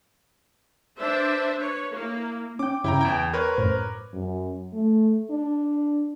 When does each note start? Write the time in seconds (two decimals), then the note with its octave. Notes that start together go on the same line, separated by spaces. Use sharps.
0.99 D4 B4 C5 E5
1.56 B4 C#5
1.92 A#3 E4
2.59 C#4 G5 D6
2.84 G2 C#3 E4 G5 A#5
3.01 E2 G5 G#6 D7
3.33 A#4 B4 C#5 C6
3.57 F#2 A2 C5
4.13 F#2
4.73 A3
5.30 D4